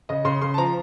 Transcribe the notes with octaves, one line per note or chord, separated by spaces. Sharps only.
C#3 D#5
C#3 C6
C#3 C6
A5
F3 A#5